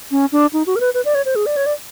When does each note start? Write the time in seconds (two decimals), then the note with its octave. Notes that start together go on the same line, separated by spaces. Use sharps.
0.11 C#4
0.32 D4
0.53 D#4
0.67 F#4
0.76 A#4
0.80 B4
0.94 B4
1.05 D5
1.15 C#5
1.26 C5
1.36 G#4
1.46 D5
1.57 C#5
1.66 D5